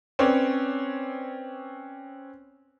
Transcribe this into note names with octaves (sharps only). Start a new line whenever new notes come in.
C4 C#4 B4 C#5 D5